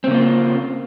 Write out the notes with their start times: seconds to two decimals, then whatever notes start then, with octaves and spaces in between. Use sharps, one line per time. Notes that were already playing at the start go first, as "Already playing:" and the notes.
0.04 C4
0.07 C#3
0.11 A#3
0.14 F4